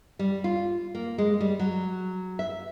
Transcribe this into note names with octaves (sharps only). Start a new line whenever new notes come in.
G3
F4
A#3
G#3
G3
F#3
E5